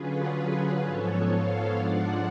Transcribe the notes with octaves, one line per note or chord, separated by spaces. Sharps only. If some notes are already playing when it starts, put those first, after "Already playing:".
Already playing: D3 F#3 C#4 F4 G#4 B4
G#4 B4
G#2 F3 B3 A4 C#5
C#5 F5
G#2 F3 G#3 D4 F4 D5 F#5